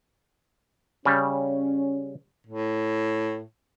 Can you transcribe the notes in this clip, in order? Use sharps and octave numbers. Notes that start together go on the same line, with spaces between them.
C#3 G3 C#4
A2